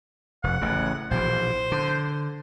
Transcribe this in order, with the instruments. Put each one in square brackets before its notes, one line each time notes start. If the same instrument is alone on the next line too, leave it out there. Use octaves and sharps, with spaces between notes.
[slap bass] F1 [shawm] F#5
[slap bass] A1 A2 C#3
[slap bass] A#1 B2 E3 [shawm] C5
[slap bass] D3